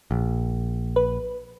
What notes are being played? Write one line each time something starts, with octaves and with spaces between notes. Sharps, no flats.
A#1
B4